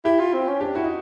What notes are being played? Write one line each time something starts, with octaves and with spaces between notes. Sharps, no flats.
E4 G4
F4
C4
C#4
D4 G4
E4 F#4
D#4